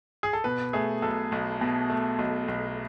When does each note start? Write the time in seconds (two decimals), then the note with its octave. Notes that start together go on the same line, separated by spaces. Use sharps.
0.23 G#4
0.33 A4
0.44 B2 B4
0.73 A3 G#4
1.02 B1 A4
1.32 B1
1.61 B2
1.90 A3
2.19 B1
2.48 B1